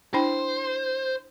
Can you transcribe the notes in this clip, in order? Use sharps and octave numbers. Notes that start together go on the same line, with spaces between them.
D4 E4 C5 G5